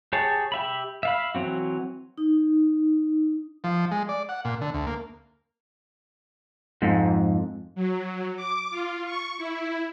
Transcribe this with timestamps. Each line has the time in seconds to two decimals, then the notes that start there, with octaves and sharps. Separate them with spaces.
0.13 G4 G#4 C#5 A5
0.52 G4 E5 B5
1.03 E5 F5 B5
1.35 E3 F#3 C4 F#4
2.18 D#4
3.64 F3
3.91 G#3
4.09 D5
4.29 F#5
4.45 A#2
4.61 D3
4.74 D2
4.87 A#3
6.82 F2 G#2
7.75 F#3
8.36 D6
8.70 F4
9.05 C#6
9.38 E4